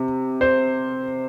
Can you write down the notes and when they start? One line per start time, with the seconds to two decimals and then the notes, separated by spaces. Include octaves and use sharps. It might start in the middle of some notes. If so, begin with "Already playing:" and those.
Already playing: C3
0.41 C5